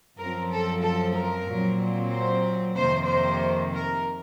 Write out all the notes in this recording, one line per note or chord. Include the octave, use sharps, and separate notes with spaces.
F#2 F3 C4 A#4
A4
A4
A#4
A#2 F#3 C4
C5
F2 C3 D#3 A#3 C5
C5
A#4